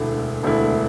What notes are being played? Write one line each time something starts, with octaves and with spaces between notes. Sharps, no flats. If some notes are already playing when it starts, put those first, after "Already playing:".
Already playing: E1 D2 D3 A3 E4
E1 D2 D3 A3 E4